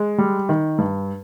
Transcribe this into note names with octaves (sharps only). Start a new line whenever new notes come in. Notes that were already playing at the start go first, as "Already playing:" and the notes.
Already playing: G#3
G3
D#3
G2